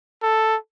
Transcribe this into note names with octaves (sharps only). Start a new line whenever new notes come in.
A4